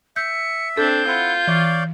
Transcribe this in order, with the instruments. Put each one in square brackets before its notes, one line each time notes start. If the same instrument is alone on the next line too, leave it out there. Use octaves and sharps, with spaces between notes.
[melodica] E5 [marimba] G6 [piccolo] C#7
[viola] C4 D4 [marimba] A4 [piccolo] G6
[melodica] E4 F#5 [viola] F4
[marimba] E3 [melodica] C#5 D5 F5